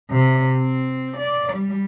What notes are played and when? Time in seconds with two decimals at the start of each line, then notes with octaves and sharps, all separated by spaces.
0.10 C3
0.57 C4
1.17 D5
1.53 G3